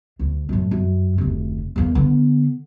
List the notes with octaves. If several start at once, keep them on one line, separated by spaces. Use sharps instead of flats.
D2
F#2 A2
F#2
F1 D2
E2 A#3
D3 B3